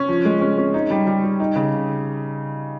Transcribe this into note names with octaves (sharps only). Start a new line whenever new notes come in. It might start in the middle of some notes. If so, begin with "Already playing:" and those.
Already playing: C#4
F3
G#3
C#4
C#4
D#4
G3
G3
G3
D#4
C#3